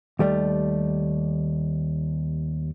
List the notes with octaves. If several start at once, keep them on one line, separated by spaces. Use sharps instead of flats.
D#2 G3 A3